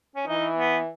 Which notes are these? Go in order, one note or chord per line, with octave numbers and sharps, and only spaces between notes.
C#4
E3 D#4
B3